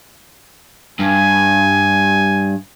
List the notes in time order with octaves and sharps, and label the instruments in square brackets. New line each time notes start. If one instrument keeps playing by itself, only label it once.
[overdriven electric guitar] G2 [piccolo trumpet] G#5